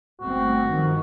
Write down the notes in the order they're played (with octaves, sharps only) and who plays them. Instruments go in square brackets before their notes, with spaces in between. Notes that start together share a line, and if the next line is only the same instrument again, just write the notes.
[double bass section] G1 A3 C4 [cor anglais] F#4
[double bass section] G2 D#3 F3